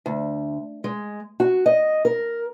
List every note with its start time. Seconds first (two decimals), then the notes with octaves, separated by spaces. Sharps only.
0.06 D2
0.84 G#3
1.40 F#4
1.66 D#5
2.05 A#4